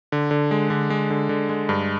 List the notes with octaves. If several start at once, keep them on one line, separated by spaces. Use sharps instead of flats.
D3
D3
G#3
D3
G#3
D3
D3
G#3
G2